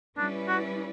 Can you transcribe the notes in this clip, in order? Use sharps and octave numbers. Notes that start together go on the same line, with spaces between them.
G3 C#4 D4 E4 B4 D5
F#4